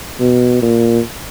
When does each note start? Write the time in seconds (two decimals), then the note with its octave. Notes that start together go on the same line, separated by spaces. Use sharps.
0.20 B2
0.62 A#2